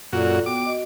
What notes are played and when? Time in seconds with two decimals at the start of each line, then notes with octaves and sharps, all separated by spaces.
0.13 F#2 A#2 F4 F#4 A4 D5
0.46 B3 F#4 G5 D6
0.66 F#4 D#5